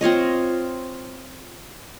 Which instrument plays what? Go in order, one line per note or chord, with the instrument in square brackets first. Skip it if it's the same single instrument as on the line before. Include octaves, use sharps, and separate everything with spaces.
[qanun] C4 F4 C#5 D#5